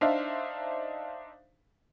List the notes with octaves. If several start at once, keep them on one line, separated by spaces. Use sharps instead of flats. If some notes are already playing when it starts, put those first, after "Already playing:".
D4 D#4 C5 E5 F5